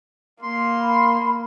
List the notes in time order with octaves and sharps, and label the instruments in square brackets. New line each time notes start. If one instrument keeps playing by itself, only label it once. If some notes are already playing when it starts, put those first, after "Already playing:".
[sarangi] A#3 [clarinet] C6
[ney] B5